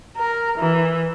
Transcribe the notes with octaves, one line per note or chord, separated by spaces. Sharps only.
A#4
E3